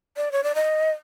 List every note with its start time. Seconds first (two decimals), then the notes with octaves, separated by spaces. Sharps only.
0.17 D5
0.32 C#5
0.44 D5
0.55 D#5